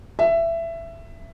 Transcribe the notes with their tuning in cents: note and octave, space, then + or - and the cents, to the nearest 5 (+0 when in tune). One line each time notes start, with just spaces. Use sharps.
E5 +15